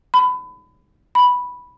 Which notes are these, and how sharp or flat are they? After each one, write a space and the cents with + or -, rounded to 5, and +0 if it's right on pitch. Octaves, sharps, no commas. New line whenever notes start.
B5 +30
B5 -5